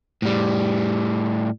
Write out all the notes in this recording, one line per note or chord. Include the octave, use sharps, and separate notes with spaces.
A2 G3